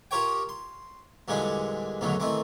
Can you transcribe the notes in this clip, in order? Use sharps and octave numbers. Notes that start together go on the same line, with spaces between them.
F4 G4 A#4 C#5 G5
C6
E2 A#2 D3 G3 G#3 D4
B1 E2 A2 D3 D#3 F#3
D#3 E3 A3 C4